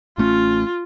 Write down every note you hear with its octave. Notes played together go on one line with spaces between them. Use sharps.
A1 A3 C#4 F4